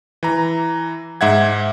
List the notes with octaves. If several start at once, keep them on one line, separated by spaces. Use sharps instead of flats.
E3 A#5
G#2 E5 F#5 G#6